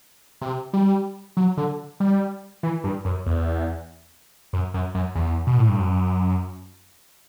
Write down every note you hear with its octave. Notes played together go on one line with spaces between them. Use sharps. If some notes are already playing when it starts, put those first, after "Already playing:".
C3
G3
F#3
D3
G3
E3
G2
F#2
E2
F#2
F#2
F#2
E2
B2
A2
G2
F#2